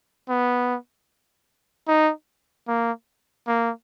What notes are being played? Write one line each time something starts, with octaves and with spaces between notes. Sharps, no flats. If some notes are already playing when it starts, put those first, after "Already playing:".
B3
D#4
A#3
A#3